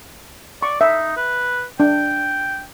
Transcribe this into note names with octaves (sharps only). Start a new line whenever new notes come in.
D5 C#6
D#4 E5
B4
D4 G5